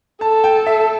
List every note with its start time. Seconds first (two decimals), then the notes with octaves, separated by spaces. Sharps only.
0.21 A4 A5
0.44 G5
0.66 E5